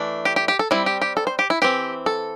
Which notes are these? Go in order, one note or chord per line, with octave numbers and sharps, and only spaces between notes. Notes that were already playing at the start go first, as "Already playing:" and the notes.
Already playing: E3 A3 D4
G4
G4
G4
A4
G3 C4 E4
G4
G4
A4
C5
G4
E4
E3 C4 G4
A4